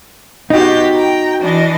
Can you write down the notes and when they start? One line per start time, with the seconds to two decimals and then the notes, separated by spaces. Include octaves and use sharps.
0.50 B2 D#4 F#4 G4 G6
0.95 G5 A#5
1.41 E3 D4 D#5